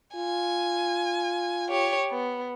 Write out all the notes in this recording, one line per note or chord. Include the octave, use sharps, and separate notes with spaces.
F4 G#5
G4 C#5
B3